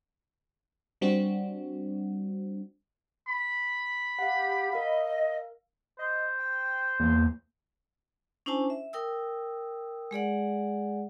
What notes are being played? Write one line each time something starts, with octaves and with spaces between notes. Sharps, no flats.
G3 C4 D4 F#4
B5
G4 F5 F#5
A#4 D#5 F5
C5 D#5
G5
E2 A#3
C#4 D4 E4 C5 G#5 A5
E5
A#4 G5 D#6 E6
G#3 G#4 D5 F#5